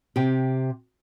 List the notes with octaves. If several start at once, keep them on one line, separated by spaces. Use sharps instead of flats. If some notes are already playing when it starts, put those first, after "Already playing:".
C3 G4